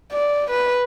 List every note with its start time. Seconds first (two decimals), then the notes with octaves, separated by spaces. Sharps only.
0.12 D5
0.51 B4